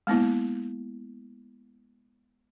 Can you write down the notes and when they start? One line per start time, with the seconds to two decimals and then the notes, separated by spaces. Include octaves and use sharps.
0.07 G#3 A#3 B3 E4